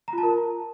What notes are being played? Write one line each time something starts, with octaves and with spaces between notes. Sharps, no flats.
A#5
F4
A5
A#4